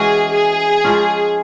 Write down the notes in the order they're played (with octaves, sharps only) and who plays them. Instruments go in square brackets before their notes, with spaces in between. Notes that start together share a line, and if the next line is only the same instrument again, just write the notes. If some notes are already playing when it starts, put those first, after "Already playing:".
Already playing: [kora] E3 G#3 C#4 F#4 [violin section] G#4
[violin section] G#4
[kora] F3 G#3 C#4 F4